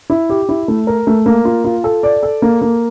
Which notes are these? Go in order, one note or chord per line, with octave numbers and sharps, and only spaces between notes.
E4
G4
E4
A3
A#4
A3
A#3
F4
F4
A4
D5
A4
A#3
A#3